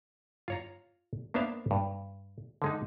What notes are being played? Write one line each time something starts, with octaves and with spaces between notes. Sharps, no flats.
F4 C#5 A#5
A#3 B3 D4 C5 E5 F5
G2
D3 G#3 D#4